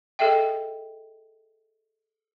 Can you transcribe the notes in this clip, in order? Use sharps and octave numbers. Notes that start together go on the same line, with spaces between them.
G#4 A4 D#5 E5 G5